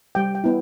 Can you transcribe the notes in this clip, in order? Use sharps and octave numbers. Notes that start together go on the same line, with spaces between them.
G3 G5
G5
B3 E4